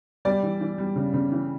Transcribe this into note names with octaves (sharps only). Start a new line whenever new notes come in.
G3 D5
E3
E3
G3
C#3
C#3
E3